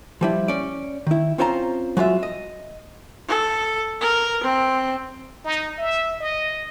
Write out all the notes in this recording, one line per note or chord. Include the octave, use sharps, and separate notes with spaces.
F3 G3 E4
C#4 D5
D#3 E4
C4 C#4 F4 C5 G5 A#5
F#3 G#3 F4 E5
D#5
A4
A#4
C4
D#4
E5
D#5